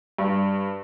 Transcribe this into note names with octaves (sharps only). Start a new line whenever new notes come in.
G2